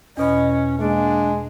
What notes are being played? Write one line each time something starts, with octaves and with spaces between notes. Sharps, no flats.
E2 B2 C#4 D#5 B5
G#3 A#3 D4